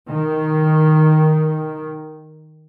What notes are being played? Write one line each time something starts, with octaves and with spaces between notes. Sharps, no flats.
D#3